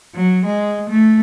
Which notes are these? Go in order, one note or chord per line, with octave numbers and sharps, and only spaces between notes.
F#3
G#3
A3